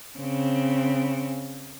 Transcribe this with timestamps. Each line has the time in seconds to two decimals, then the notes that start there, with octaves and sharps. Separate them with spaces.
0.19 C#3 C4